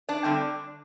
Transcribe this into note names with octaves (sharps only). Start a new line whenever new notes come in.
D4 D5
D3 G3 C4